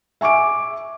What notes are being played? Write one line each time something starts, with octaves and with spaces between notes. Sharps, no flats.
E5 G#5 C#6 D6 D7